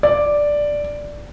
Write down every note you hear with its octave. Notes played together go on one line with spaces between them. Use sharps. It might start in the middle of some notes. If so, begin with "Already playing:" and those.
D5